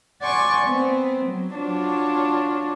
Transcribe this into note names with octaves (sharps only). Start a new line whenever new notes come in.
D5 F#5 G#5 C6 C#6
B3 C4
F#3
D4 F4 F#4 C#5